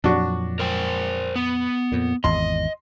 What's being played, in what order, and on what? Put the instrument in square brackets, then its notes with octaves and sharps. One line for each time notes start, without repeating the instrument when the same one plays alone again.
[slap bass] F2 A#2 F#3 [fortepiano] D4 F#4
[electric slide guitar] A#4 C5 G5
B3
[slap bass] F2 A#2
[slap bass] G#1 E2 [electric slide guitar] D#5 [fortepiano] C6